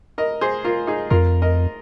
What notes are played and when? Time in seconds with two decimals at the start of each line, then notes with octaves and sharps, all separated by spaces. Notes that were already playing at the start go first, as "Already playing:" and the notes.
0.18 A#4 D#5
0.41 G#4 C5
0.65 F4 A#4
0.87 D#4 G#4
1.10 F2 F4 A#4
1.42 A#4 D#5